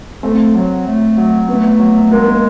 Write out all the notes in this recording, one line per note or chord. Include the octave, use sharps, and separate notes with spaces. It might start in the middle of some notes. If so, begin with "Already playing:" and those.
A3 C4
F#3
A3
F#3
A3 B3
F#3
G#3 A#3
A#3